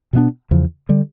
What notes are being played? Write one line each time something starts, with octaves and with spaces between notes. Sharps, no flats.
B2 G#3 B3 D4
E2 C#3 F3
D3 G3